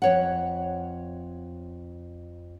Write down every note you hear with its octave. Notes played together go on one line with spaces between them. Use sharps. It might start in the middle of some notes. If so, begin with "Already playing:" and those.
F2 C#5 F#5